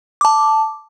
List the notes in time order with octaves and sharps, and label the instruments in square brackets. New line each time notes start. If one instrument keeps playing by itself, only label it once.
[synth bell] A5 D6